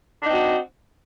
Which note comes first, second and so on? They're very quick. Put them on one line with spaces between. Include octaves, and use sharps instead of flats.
D4 D#4 C4 F#4